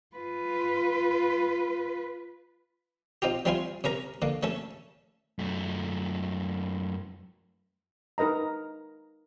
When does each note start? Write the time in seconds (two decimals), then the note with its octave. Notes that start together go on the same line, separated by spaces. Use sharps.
0.16 F4 B4
3.22 C4 D#4 F4 G4
3.45 G3 C4 E4 F4 G#5 C6
3.84 C3 C#4 A#4 A#5
4.22 D3 A#3
4.43 A3 C#4 A4
5.39 F#2 A3
8.18 D#4 A#4 B4 D#5 A#5